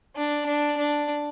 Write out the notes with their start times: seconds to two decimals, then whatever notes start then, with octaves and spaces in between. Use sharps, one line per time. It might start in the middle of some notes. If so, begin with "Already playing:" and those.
0.16 D4
0.46 D4
0.77 D4